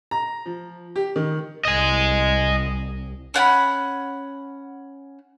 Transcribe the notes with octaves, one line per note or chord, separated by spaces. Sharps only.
A#5
F3
G4
D#3
C2 D#5 G#5
C#4 F#5 G5 B5